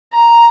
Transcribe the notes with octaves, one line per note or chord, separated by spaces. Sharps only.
A#5